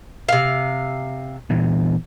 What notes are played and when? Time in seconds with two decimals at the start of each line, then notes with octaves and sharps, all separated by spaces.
0.29 C3 F5
1.50 A#2 E3 B3